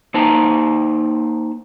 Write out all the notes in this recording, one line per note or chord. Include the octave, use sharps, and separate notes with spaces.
A#3 D#4 C5 A5 A#5